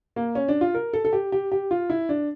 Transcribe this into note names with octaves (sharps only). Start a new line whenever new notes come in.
A#3
C#4
D4
F4
A#4
A4
A4
G4
G4
G4
F4
E4
D4